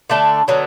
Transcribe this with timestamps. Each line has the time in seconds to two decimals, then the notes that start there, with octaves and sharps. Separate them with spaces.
0.10 D3 A3 D4 A4
0.48 D3 F#3 B3